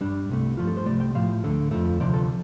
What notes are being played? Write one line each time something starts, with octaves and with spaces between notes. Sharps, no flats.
G2 G3 D4
C2 C3 A3
G2 F3 A3 F4
A4
C5
C2 C3 A3 D5
G5
A2 F3 A3 F5
D2 D3 A3
F2 F3 A3
D2 C3 F3 D5
A4